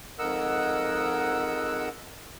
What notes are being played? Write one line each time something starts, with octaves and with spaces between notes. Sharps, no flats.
F2 G#2 A#4 D#5 F#5 E6